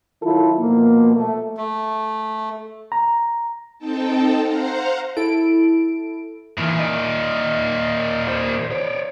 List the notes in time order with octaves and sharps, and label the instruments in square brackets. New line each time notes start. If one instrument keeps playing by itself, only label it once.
[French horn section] D#3 F#3 E4 F4 A4
B2 F3 A#3
A3
[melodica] A3
[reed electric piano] A#5
[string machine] C4 D#4 A4 G5 A5
C5 F5 F#5 A#5
[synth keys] E4 A4 D7
[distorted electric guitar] A#2 D#3 [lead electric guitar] E3
[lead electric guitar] D5 D#5
C5 D5
C#5 D5